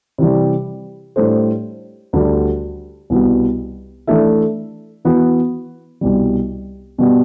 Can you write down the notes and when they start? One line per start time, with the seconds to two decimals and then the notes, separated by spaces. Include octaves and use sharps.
0.18 C3 E3 G3
1.16 A2 G3 D4 A4 C5
2.13 D2 D3 G3
3.10 C2 B2 G3 B3 F#4
4.07 E3 A3 D4 A4 E5
5.05 E3 B3 F#4
6.01 C2 B2 G3
6.98 B2 G3 B3 F#4